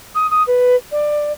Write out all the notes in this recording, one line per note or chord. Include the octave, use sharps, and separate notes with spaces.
D#6
D#6
B4
D5